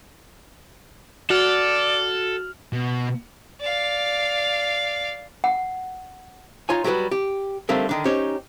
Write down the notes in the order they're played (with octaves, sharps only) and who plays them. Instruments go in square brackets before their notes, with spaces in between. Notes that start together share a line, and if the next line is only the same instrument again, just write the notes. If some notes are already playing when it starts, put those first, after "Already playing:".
[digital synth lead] F#4 [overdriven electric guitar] A4 [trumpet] D5 [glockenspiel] F6 F7 F#7
[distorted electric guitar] B2
[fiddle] D5 F5
[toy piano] F#5
[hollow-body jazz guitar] D#4 F4 C#5 G#5
F#3 G3 F#4 G4 B4
G4
D3 D#3 G3 A3 A#3 C4
D3 D#3 D4
C#4 D#4 G4 C5 C#5